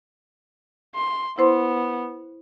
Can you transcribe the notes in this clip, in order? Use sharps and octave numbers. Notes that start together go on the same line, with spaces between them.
C6
B3 E4 C5 C6